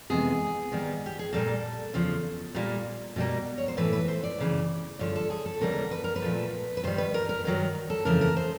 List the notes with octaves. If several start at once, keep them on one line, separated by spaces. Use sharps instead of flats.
F2 C3 E3 G#3 B3 G#4
G#2 D#3 G3 B3
G4
G#4
A#2 G3 A#3 A4
E2 C#3 F3
A#2 G3 A#3
B2 G3 A#3
C#5
C5
A2 E3 A3 B4
B4
C5
D5
F#2 C#3 E3
G2 D3 F3 C#5
A4
G#4
A4
D#2 C#3 E3 G3 B3 A#4
B4
A#4
B4
A#2 F3 A3
B4
G2 D#3 G3 C5
B4
A#4
A#4
G2 D#3 F#3 A#4
A4
F2 C#3 E3 A3 A#4
A#4
C5